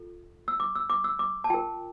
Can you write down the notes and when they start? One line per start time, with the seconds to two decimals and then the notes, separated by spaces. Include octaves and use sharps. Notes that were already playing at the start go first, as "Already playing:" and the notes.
Already playing: F4 A4
0.48 E6
0.60 D6
0.75 E6
0.90 D6
1.04 E6
1.19 D6
1.44 A5
1.50 F4 A#4 G5